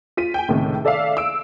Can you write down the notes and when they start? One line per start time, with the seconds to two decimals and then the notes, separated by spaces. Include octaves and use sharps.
0.17 F4 B6 D#7
0.34 G5 G#5
0.48 C#2 A2 C3 D#3
0.85 A4 D5 E5 F5
1.17 E6 D7